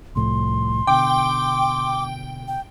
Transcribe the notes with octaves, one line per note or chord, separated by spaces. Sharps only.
C2 A2 F3 C6
B2 D3 G5 D6
G5